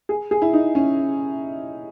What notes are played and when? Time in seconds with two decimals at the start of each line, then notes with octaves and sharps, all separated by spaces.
0.09 G#4
0.31 G#4
0.42 E4
0.53 D#4
0.75 C#4